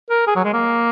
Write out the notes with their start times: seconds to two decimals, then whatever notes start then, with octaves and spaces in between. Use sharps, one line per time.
0.10 A#4
0.27 G#4
0.36 F#3
0.45 G#3
0.53 A#3